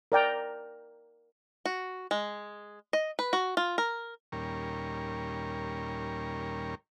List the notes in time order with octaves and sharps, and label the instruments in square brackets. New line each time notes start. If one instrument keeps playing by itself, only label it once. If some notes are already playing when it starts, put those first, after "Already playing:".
[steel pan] A#4 D5 G5 A#5
[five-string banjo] F#4
G#3
D#5
B4
F#4
F4
A#4
[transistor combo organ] D#2 A#2 G3 C#4 A#4 C#6